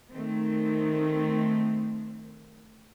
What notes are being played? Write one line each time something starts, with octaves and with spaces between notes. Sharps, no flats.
D#3 A3 C4